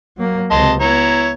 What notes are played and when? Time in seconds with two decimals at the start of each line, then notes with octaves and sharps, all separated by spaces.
0.17 F#3 A#3
0.51 C#2 C3 D#5 A5 C6
0.81 B3 E4 C#5 A#5